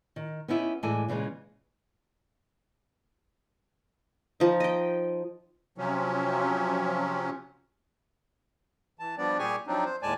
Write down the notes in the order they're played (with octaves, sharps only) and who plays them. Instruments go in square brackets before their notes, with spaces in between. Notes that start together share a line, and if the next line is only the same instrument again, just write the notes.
[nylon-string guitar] D#3
B3 C#4 D#4 E4 G4
A2 E3 G#3 A4 D5 G#5
A#2 C#3 E3 G#3
[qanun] F3 D#4
D#5 G5
[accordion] C3 F3 F#3 C#4
E3 A5
F3 G3 B3 D4 D5
A#2 G3 G4 G#4 G#5 C#6
F3 F#3 C4 D4 D#4
C5
D#2 A2 G#3 D5 G#5 A5